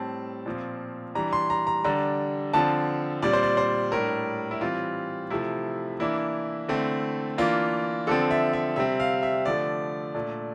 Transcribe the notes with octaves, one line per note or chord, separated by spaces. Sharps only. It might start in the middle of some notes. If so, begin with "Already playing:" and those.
Already playing: A2 G3 C4 A5
A#2 F3 C4
E3 G3 D4 A#5
C6
A#5
A#5
D3 G3 D4 A#5
D3 F3 C4 A5
A#2 G3 C4 D5
C5
D5
C5
A2 G3 D4 A#4
E4
E3 G3 C4 F4
C3 F3 A3 E4
E3 A#3 D4 E4
D3 A3 C4
E3 A#3 D4 F4
D3 F3 C4 A4
E5
E5
C3 G3 C4 E5
F5
E5
D3 F3 A3 D5
A#2 A3 D4